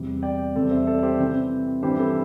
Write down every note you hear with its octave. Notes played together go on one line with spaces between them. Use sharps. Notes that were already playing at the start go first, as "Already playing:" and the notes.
Already playing: E2 C3 G3 C4
D5 G5
E2 C3 G3 C4 A4 D5
C5 E5
A4 D5
D5
G4 C5
C3 E3 C4
G2 E3 C4 G4 C5
A4